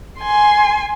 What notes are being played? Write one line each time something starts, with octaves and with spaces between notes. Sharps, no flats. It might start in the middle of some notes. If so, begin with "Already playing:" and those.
G#5 C6